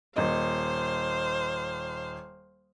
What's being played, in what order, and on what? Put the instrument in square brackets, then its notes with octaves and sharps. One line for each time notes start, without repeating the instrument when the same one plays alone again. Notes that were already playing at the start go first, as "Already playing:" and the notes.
[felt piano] D#1 D#5 [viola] C5 F5